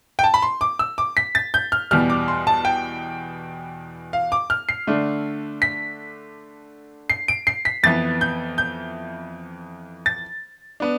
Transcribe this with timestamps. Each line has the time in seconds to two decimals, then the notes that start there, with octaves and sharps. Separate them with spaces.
0.19 G5
0.24 A5
0.34 B5
0.42 C6
0.61 D6
0.79 E6
0.98 D6
1.17 B6
1.35 A6
1.54 G6
1.72 F6
1.91 E2 B2 G3 F6
2.10 D6
2.28 C6
2.47 A5
2.65 G5
4.13 F5
4.32 D6
4.50 F6
4.69 C7
4.87 D3 A3 D4
5.62 B6
7.10 C7
7.28 D7
7.47 C7
7.65 B6
7.83 F2 E3 B3 A6
8.21 G6
8.58 G6
10.06 A6
10.80 B3 D4